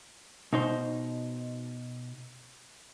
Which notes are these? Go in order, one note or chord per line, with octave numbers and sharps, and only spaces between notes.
B2 D#4 C5